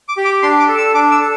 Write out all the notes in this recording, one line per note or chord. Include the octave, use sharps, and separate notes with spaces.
D6
G4
D6
D4 C6
D6
A4
E6
D4 D6
E6
A4